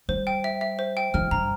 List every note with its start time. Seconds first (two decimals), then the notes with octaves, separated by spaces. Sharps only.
0.09 G3 C5
0.27 G5
0.44 E5
0.61 E5
0.79 C5
0.97 G5
1.14 F3 F6
1.31 G2 A#5